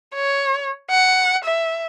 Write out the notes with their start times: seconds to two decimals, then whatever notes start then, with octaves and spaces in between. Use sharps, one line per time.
0.15 C#5
0.90 F#5
1.45 E5